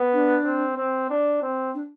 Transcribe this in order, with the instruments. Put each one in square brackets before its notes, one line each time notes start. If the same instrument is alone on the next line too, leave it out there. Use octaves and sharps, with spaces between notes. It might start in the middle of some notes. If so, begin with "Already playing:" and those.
Already playing: [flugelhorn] B3
[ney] D4
[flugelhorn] C4
C4
D4
C4
[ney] D4